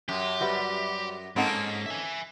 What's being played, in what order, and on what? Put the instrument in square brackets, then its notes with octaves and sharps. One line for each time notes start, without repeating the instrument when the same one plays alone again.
[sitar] F#2 [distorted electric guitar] G4
[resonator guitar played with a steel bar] G3 F#4 B4
[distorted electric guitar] G#2 [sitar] A#3 C#4 D#4 [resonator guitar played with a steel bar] C4 A4 F#5
[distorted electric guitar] E5 G#5